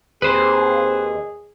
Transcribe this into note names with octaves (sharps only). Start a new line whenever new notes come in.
D#2 C4 G#4 B4 C5